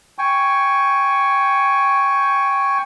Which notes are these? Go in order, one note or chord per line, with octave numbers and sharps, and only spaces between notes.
G5 G#5 C#6